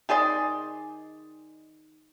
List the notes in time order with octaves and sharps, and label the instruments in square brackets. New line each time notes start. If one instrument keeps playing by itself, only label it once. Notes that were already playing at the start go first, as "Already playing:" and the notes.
[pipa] D#3 G#4 D5 C6